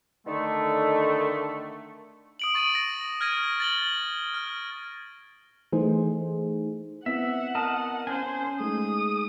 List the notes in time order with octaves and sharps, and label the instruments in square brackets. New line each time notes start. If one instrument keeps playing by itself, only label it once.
[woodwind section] D3 D#3 A3
[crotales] D#6 D7 F#7
C#6 A6 D7 D#7
A#6
F6 G#6 A#6 D#7
A6 F#7 G7
F6
[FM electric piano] E3 A3 D#4 G#4 C5
[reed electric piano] B3 C4 E4 [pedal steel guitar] E5 [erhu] F#5
[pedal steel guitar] A#4 D#5 A5
[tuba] C#4 [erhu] C5 [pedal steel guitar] G#5 G6
[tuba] G#3 [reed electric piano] A3 D#4 [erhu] D#6